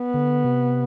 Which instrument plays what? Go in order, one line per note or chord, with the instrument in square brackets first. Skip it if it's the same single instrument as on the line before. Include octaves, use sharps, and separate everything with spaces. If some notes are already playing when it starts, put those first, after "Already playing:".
Already playing: [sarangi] B3
[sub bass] D3
C3